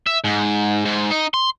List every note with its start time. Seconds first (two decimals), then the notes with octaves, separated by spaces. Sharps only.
0.07 E5
0.24 G#2
0.85 G#2
1.11 D#4
1.34 C6